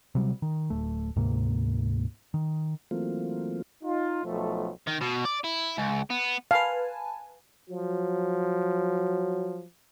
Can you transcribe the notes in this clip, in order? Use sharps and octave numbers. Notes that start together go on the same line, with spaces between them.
C3 F#3 G3
D#3
D1 A3
D2 G#2 C3 A#3
D#3
E3 F#3 A3 A#3 C4 F4
D#4 F4
B1 F3 A3
D#3
B2
D5
E4
C#2
B3
B4 F5 G#5 A5
F3 F#3